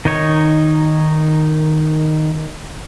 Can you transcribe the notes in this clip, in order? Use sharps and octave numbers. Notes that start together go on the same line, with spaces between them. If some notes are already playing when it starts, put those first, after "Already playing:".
D#3 D#4 C#5